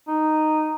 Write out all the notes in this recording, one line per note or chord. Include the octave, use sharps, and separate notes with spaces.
D#4